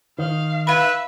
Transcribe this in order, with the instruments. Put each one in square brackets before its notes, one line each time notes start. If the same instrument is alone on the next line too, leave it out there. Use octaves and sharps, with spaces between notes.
[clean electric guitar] D#3 [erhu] F5
[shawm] B4 [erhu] E5 [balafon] F5 B5